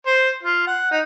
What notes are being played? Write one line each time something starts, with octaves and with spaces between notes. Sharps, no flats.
C5
F4
F#5
D#4